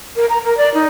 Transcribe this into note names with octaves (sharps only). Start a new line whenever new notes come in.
A#4
A#5
A#4
D5
D#4